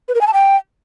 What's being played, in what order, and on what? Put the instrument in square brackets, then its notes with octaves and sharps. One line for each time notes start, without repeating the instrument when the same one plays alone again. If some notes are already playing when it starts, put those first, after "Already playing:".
[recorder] B4
A#4
G#5
A5
G5